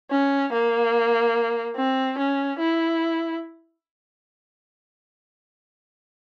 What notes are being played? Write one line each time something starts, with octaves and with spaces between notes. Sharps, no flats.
C#4
A#3
C4
C#4
E4